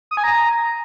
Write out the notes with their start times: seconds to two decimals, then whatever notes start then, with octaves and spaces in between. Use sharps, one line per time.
0.11 D#6
0.17 G#5
0.24 A#5